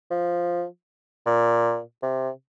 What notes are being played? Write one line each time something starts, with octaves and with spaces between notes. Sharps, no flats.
F3
A#2
C3